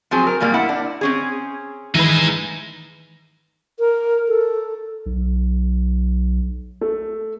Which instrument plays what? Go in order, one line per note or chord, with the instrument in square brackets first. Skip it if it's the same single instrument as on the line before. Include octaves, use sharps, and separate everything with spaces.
[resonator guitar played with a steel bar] F3 F#3 C4 G#4
A#4
A#2 F#3 G3 A#3
E4 F#5
D4
C4 C#4 G#4
[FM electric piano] D#3 E3 [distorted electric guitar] G#3 D#4 [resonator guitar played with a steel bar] E4 B4
[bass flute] A#4
A4
[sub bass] B1
[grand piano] A3